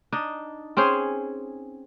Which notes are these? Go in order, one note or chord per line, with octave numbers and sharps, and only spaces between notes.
D4 D#4
C4 C#4 G#4 C5